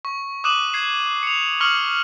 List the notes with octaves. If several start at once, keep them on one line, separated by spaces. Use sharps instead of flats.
C#6
D6 D#6 F#6 D#7 E7 F#7
F#6 G#6 C7
C#7 F7
C#6 D#6 F6 C#7 F#7 G7